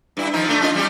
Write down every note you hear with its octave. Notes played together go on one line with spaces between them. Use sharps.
G2 E4
D#3 F3 D#4
A3 D4
C#4 F4 D#5
G3 C#4 G4